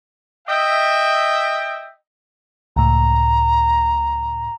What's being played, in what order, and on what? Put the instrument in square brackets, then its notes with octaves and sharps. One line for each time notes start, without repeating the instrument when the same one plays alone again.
[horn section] D#5 E5 G5
[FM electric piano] C#2 A2 [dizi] A#5